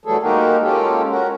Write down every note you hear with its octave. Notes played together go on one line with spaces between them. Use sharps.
E3 F#3 G3 A3 G#4 A4
G#3 A#3 D#4 F#4 G4 A#4
G#3 A#3 C#4 F4 G4 A4
C#4 F#4 A#4